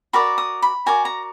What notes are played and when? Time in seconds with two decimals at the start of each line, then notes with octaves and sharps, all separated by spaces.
0.13 F#4 A#4 D5 B5
0.38 D#6
0.62 B5
0.86 F#4 A#4 D5 G#5
1.05 A#5